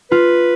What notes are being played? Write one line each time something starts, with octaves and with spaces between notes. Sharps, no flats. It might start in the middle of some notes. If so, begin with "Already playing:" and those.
F4 B4